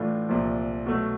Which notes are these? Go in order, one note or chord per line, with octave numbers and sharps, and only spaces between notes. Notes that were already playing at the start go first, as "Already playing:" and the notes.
Already playing: A2 E3 A3 D4 F4
C2 A#2 F3
B2 F#3 A3